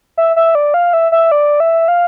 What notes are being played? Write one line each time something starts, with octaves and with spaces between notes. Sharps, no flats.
E5
E5
D5
F5
E5
E5
D5
E5
F5